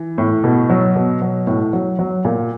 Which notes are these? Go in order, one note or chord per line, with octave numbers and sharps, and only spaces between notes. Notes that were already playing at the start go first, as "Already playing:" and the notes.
Already playing: E3
A2
B2
F#3
B2
F#3
A2
F#3
F#3
A#2